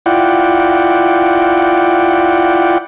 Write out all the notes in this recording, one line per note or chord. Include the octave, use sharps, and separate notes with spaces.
E4 F4 D5 F#5 G5